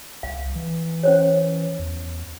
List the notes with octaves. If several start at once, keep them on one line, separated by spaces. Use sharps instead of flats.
C2 F5
E3
C#4 C5 C#5
E2